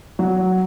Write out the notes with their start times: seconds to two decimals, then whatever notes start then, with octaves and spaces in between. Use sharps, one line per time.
0.19 F#3